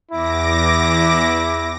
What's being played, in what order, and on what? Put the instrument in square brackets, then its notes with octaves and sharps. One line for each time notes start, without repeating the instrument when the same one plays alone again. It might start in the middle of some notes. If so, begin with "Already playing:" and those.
[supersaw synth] E2 D6 A#6 [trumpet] E4